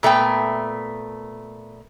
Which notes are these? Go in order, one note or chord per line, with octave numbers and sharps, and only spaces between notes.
A#2 A3 B3 G5